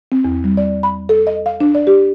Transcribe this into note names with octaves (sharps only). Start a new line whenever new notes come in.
C4
E2
G3
D5
B5
A4
D#5
F5
D4
D5
G4